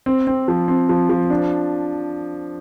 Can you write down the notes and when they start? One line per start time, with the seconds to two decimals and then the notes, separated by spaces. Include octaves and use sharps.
0.06 C4
0.27 C4
0.48 F3
0.68 C4
0.89 F3
1.10 F3
1.30 D4